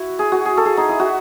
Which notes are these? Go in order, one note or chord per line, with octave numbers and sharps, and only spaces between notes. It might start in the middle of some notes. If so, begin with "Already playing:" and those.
Already playing: E4 F#4
G#4
F#4
G#4
A4
G#4
D#4
E4
F#4